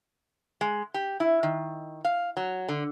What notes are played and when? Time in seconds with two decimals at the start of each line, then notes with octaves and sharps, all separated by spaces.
0.61 G#3
0.94 G4
1.20 E4
1.43 D#3
2.05 F5
2.37 F#3
2.69 D3